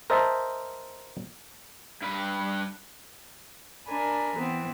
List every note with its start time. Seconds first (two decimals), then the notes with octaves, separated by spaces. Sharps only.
0.10 A#4 C5 D#5 E5 A5
2.02 G2 B4
3.87 D4 A#4 G#5 B5
4.35 E3 B3 C4